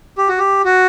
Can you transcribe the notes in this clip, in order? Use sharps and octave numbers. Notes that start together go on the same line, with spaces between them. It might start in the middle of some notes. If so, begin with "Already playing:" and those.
G4
F#4
G4
F#4